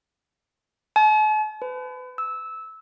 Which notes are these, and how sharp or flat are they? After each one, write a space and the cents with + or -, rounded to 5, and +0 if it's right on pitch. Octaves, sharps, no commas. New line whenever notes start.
A5 -45
B4 +35
E6 -15